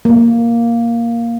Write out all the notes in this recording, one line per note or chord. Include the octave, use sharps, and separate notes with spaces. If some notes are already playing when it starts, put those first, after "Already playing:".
A#3